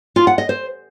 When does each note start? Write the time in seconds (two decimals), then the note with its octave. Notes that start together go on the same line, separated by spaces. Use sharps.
0.16 F4
0.27 F#5
0.38 D#5
0.49 C5